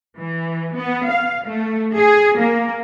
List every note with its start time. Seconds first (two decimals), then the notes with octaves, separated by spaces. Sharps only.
0.19 E3
0.78 B3
1.10 F5
1.48 A3
1.97 G#4
2.37 A#3